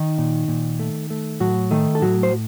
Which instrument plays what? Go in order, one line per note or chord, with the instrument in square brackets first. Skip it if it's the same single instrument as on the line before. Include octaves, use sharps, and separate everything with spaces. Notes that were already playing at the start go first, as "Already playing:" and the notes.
Already playing: [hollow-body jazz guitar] D#3 D#4
A#2
A#2
A3
A3
A2 F#3 F#4
D#3 A3 D#4
A4
A2 F#3 F#4
C5